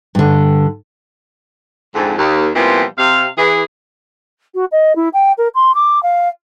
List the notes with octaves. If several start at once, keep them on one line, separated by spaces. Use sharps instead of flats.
G2 D3
F2 G#2 D3
D#2
A#2 E3 F3 G3 B3 C4
C3 F5
E3 G#4
F#4
D#5
E4
G5
A#4
C6
D6
F5